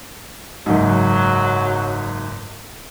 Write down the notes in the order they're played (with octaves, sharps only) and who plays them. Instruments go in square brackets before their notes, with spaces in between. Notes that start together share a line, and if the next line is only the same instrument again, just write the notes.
[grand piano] F#1 G#2 [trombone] F#3